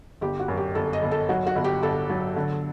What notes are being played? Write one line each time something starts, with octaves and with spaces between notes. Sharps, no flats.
G1 G4
F#4
F#2
G4
G1 A4
D#5
G1
A4
F#3 F#4
F#4
G1
G4
G1 A4
F#3
D3